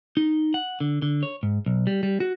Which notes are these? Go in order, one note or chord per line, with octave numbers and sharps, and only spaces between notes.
D#4
F#5
D3
D3
C#5
G#2
B1
G3
G3
F#4